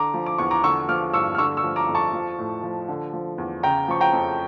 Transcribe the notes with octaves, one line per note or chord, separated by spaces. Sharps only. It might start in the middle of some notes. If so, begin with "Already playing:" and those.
Already playing: D3 A#5 D6
F3
D6
E2 C#6
A#5 D6
D3 C#6 E6
F3 D6 F6
G2 C#6 E6
F6
D3 C#6 E6
C#6 E6
F3
A#5 D6
F2
A5 C#6
F3
A2
F3
D3
F3
E2
C#3 G5 A#5
F3 C#6
G5 A#5
F2